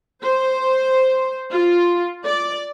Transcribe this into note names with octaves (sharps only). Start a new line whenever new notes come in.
C5
F4
D5